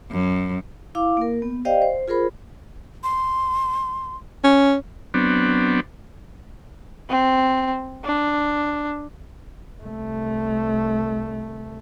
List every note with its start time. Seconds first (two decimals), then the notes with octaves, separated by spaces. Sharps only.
0.11 F#2
0.95 E4 F5 D6
1.17 A#3 A#4
1.42 B3
1.65 G4 C5 D5 D#5 F5 G5
1.82 C5
2.08 F4 G#4 A#4 C5 B5
3.04 C6
4.44 C#4
5.14 F#3 B3 C4 D4
7.09 C4
8.05 D4
9.83 C2 A3